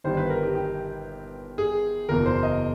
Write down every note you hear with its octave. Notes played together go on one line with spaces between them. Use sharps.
G1 G2 D#3 C5
B4
A#4
G4
G4
G#4
F#1 E2 B2 A#4
C5
D#5